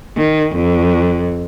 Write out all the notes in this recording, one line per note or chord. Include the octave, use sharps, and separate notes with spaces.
D#3
F2